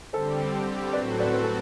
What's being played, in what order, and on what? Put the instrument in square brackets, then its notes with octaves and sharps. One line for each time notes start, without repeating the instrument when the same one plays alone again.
[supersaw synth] D3 G3 C4 G4 [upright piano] A4 C5
[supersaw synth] A2 F#3 C4 F#4 A4 [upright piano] B4 D5
[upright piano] B4 D5
B4
A4